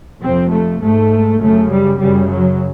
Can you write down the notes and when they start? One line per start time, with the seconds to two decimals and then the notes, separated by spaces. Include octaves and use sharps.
0.21 F2 C3 C4
0.51 A3
0.81 G#2 A3
1.40 F#2 C#3 A3
1.70 G3
1.99 F#2 C#3 G3
2.30 F#3